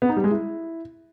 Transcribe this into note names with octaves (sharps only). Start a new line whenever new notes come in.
B3
D#4
G3
G#3
E4